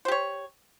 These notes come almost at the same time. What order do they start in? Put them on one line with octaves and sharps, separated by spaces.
C5 G4 C#5